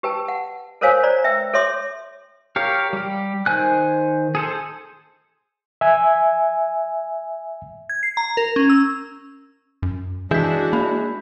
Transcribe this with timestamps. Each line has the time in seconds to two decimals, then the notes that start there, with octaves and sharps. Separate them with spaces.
0.03 G4 B4 G5 A5
0.28 F#5
0.81 A4 A#4 C5 C#5 F5 G#5
1.03 C5 D5 A#5
1.24 B4 E5 G5 E6
1.54 A4 C#5 E5 C6 D6
2.56 G4 A#4 C#5 F5
2.93 G3 G4
3.46 D#3 C5 G#5 F#6
4.35 G#4 A4 C5
5.81 E5 G#5
7.89 G#6
8.03 C7
8.17 A#5
8.37 A#4
8.56 C#4
8.70 E6
9.82 F#2
10.31 E3 G#3 D4 E4 F#4 G#4 G6 B6
10.73 A#3 B5